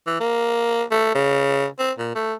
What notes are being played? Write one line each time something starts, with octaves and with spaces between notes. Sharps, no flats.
E3
A#3
A3
C#3
C4
A#2
A3